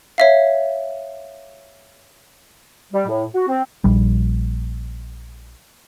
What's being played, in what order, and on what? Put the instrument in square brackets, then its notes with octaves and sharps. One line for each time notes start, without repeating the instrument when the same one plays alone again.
[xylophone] C#5 E5 F5
[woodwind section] G3
A2
F#4
C4
[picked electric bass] A#1 G3